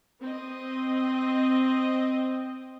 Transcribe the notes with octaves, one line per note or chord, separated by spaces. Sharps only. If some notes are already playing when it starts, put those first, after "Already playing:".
C4 D#5